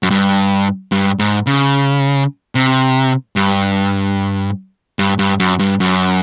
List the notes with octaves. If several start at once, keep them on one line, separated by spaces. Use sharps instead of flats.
F#2
G2
G2
G#2
C#3
C3
G2
G2
G2
F#2
G2
F#2